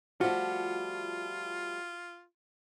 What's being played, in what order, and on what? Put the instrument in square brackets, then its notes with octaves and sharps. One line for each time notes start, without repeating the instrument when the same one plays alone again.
[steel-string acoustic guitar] F3 G3 A3 [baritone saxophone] F4 [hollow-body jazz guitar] F#4